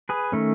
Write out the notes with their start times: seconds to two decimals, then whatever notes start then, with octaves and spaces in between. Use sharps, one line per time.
0.09 G#4 B4
0.32 D#3 A3 C#4